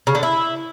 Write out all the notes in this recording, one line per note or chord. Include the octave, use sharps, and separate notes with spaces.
C#3
D3
E4